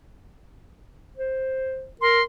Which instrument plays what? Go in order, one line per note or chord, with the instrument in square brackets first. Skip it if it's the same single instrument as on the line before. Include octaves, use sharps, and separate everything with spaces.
[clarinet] C5
[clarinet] A#4 [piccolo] C6